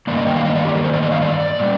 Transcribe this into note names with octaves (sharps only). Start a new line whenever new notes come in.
G2 D#3 A#3 D5
D#5
G5
F5
D#5
D5
G4
A#4
C5
D5
D#5
F5
D5
D5
A#2 G3